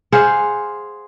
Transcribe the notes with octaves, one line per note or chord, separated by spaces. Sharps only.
G#4 C5 F5 F#5